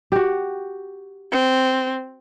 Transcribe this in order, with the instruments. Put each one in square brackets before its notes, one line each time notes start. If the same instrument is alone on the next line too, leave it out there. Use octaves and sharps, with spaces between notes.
[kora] F#4 G4
[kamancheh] C4